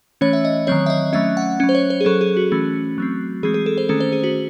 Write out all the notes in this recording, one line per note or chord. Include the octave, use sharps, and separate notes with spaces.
E3 A3 C#4 C#5
E5
D#5
D#3 F#3 C4 C#5
E5
D#5
F#3 A3 C#4 E5
F#5
F#3 C#4
C5
C#5
C5
G#4
F#3 C#4 A4
G#4
F#4
E3 A3 C#4
F#3 A3 C4
E3 G#3 C4 G#4
G#4
A4
C5
D#3 A3 C#4 A4
C5
G#4
F#4